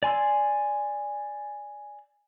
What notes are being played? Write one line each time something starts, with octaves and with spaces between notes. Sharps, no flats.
D5 G#5 C6 E6